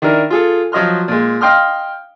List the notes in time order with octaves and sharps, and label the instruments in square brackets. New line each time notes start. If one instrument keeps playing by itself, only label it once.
[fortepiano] D#3 D4 E4 A#4
F4 G#4 A4
F3 F#3 D#5 C6 F6
A#2 G#3
D#5 F5 G5 C6 D#6 F6